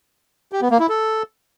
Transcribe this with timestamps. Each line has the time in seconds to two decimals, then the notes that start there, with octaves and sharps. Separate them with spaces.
0.52 G4
0.62 B3
0.71 A#3
0.80 E4
0.89 A4